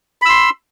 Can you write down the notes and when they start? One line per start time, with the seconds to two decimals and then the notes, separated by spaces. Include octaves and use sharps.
0.22 B5
0.25 E6
0.29 C6